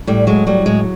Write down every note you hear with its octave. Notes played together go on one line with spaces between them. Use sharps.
A2 G3
F#3 G#3
F#3 G3
A2 G#3